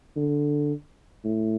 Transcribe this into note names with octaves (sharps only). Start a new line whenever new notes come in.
D3
A2